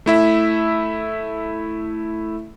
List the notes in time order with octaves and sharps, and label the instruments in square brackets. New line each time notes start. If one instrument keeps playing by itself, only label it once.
[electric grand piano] A3 E4 E5